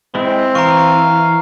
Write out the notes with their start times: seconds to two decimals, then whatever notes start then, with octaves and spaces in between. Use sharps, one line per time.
0.15 G#3 C4 E4
0.55 E3 F5 A#5 C#6